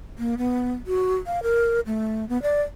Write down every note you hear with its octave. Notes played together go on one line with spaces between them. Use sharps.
A#3
B3
F#4
F5
A#4
A3
B3
D5